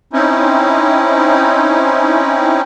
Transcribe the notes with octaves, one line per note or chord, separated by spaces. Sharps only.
C4 C#4 D#4 E4